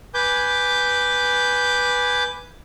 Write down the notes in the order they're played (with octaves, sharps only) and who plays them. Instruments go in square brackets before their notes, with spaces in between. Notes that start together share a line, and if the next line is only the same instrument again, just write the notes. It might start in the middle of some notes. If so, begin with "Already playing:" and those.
[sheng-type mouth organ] B4 G#5 D6 G6